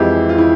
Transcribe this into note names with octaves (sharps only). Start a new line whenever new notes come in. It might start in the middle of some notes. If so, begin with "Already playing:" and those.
Already playing: F2 E3 G#3 E4 G4
F4
E4